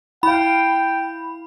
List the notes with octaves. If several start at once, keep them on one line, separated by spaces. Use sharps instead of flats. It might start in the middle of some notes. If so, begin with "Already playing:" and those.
E4 F5 G5 B5